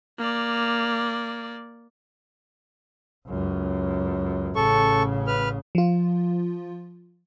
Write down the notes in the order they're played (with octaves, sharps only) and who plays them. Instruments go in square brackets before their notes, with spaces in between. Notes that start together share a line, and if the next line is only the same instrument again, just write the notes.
[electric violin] A#3 D5
[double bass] C#2 F#2
[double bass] A1 C#3 [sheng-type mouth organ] A4 C#6
[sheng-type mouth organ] B4 F6
[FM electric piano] F3 F4